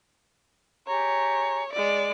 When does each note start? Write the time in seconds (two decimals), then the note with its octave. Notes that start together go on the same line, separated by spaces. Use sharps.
0.87 G4 G#4 C#5 A#5
1.72 G#3 D5